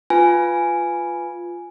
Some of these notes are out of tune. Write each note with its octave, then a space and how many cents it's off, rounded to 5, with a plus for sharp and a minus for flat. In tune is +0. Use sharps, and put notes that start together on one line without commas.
F4 +0 B4 +5 G#5 +0